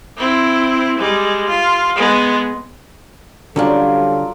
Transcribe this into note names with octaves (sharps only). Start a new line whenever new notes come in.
C4 E4
G3 G#3
F4
G#3 B3
D3 F#3 G3 C#4 D4 F4 A4 D5